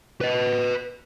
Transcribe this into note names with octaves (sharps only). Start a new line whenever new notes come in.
B4 D#5